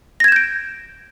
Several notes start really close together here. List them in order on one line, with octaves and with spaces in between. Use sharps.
A#6 G#6 E7 G6 D7